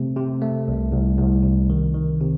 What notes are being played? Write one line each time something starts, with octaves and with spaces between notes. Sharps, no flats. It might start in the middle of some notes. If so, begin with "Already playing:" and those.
Already playing: C3 A3 C4
C3
A3
C2
C2
C2
C3
D#3
D#3
C3